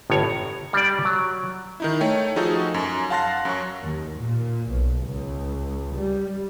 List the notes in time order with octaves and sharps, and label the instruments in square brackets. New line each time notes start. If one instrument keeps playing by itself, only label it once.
[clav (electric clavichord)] G1 A2 C#5
A#5
G3 D4 D5
F#3
[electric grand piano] D#3 D#4 E4
A3 C#5 G5
F3 D#4 F#4 G#4 A4
F#2
F5 F#5 A5 C6 F#6 A#6
F#2 F#3 C#6
[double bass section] D#2
A#2
B1
C#2
G3